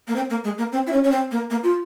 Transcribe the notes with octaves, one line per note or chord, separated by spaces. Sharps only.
A#3
C4
A#3
G#3
A#3
C4
E4
C#4
C#4
C4
A#3
A#3
F4